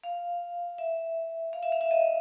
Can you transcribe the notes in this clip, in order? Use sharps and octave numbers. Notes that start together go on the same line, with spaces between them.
F5
E5
F5
E5
F5
E5
D#5